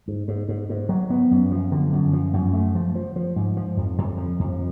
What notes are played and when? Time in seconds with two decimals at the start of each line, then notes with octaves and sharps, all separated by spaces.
0.08 G#2
0.28 G#2
0.49 G#2
0.69 G#2
0.89 F#3
1.10 B3
1.31 F#2
1.51 F3
1.72 D3
1.93 F#2
2.13 F3
2.33 F#2
2.53 A3
2.75 F3
2.95 F3
3.16 F3
3.36 G#2
3.57 F3
3.77 F2
3.98 F2
4.18 F3
4.39 F2